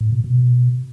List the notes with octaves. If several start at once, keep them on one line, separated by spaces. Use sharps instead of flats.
A2
B2
B2